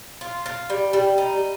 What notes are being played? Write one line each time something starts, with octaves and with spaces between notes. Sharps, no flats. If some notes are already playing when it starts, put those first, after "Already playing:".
F4
F4
G3
G3
D#4